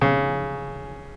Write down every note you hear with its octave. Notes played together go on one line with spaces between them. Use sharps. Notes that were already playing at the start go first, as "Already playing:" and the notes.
C#3